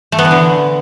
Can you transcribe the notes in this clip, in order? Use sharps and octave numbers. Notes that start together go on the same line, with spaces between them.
A3
B3
E3
D3